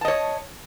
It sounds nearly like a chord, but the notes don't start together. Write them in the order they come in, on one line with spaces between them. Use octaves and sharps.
A5 D#5 C#5